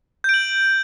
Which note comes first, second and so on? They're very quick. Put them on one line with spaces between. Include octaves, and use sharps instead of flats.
G6 D7 F#7